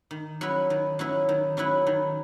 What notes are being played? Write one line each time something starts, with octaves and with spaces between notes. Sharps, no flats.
D#3
F#3 C#4 E4 B4
D#3
F#3 C#4 E4 B4
D#3
F#3 C#4 E4 B4
D#3